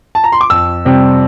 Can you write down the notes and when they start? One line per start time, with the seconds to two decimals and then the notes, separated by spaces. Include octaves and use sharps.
0.15 A5
0.24 A#5
0.32 C6
0.41 D6
0.50 F2 E6
0.85 C3 G3 C4